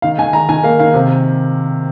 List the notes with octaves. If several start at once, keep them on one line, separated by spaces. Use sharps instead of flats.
D#3 F5
D#3 G#5
D#3 A#5
D#3 G#5
A#3 F5
D#3 F5
C3